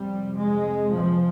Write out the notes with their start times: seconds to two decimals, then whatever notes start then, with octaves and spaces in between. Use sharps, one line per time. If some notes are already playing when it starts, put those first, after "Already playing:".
Already playing: F2 C3 G3
0.39 G#3
0.95 F3